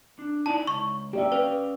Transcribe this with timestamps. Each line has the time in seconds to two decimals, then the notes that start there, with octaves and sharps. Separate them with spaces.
0.19 D4
0.46 D#4 E4 D5 A5
0.67 C#2 C#6
1.13 A#3 C#4 G4 D5 E5
1.32 C#4 B4 F5